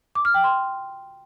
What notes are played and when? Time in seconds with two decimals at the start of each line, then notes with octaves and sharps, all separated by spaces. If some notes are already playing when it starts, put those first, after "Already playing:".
0.15 D6
0.25 F6
0.34 G5
0.44 C6